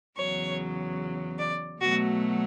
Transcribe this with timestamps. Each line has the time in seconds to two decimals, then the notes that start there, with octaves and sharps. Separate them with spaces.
0.16 E2 C#3 F#3 C#5
1.39 D5
1.80 B2 F#3 A3 F#4